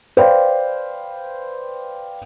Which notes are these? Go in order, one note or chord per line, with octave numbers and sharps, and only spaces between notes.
B4 C5 D5 F5 G5 B5